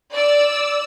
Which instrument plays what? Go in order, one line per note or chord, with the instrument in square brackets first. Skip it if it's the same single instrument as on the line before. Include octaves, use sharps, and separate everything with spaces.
[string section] D5 E6